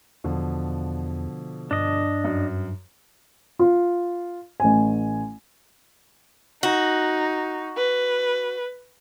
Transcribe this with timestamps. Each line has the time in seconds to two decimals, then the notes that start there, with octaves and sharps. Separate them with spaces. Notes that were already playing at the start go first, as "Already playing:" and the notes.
0.24 E2 B2 D3 F3
1.71 G2 D4 D#5
2.24 F#2
3.59 F4
4.60 A1 G#5
6.63 D#4 F#4
7.77 B4